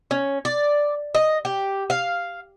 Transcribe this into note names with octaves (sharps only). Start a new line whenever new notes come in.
C#4
D5
D#5
G4
F5